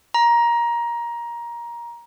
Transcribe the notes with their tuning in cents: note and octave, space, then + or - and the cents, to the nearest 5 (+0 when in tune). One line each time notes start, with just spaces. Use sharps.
A#5 +20